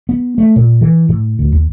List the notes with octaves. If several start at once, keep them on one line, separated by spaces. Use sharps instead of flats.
B3
A3
A#2
E3
A2
D2
D#2